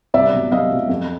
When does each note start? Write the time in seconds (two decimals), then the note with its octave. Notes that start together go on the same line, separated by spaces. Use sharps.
0.14 C2 D5 E5
0.33 B2 F#3
0.52 C2 D#5 F5
0.71 B2 F#3
0.89 F2